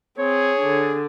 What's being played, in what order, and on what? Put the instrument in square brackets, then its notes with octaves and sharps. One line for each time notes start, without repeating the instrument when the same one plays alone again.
[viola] C4 [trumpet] G#4 [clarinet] C#5
[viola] D3 D4